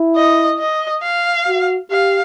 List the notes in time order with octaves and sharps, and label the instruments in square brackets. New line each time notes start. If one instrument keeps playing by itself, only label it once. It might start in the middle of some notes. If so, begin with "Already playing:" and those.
Already playing: [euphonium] E4
[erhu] D#5
D#5
F5
[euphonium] F#4
[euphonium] G4 [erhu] F5